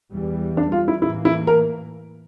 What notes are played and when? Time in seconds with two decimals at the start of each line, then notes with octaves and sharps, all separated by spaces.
0.12 E2 E3 G3
0.57 D4
0.72 F4
0.88 E4
1.02 A2 E3 A#3 E4
1.25 E4
1.47 A#4